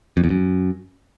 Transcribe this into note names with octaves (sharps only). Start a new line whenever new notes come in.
F2
E2
F#2